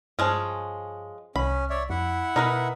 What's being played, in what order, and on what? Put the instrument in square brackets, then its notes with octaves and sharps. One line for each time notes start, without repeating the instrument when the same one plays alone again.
[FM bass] G2 [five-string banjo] F3 G#3 C#4
[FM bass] C2 [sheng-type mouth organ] C#4 [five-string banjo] B5
[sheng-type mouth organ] C#5 D5 E5
[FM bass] F2 [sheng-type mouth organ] E4 E5 F#5
[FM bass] B2 [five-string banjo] D#4 A#4 B4